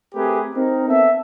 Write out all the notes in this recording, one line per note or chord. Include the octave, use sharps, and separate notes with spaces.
A3 C4 G4 G#4 A#4 B4
C4 D#4 A#4
B3 C4 A4 E5